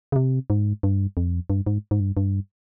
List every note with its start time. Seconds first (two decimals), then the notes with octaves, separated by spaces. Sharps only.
0.12 C#3
0.16 C3
0.50 G#2
0.83 G2
1.17 F2
1.50 G2
1.66 G#2
1.91 G#2
2.00 G2
2.17 G2